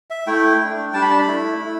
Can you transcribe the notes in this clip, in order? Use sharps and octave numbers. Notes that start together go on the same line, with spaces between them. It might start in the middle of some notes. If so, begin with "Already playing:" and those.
E5
A3 E4 G5
A3 D4
G3 D4 A5
B5
A5
B5
A3 E4
A3 E4